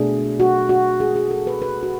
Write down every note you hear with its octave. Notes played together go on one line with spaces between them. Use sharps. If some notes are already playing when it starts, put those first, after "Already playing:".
Already playing: B2 A3 D4 G#4
F#4
F#4
G#4
G#4
A4
B4
B4
F#4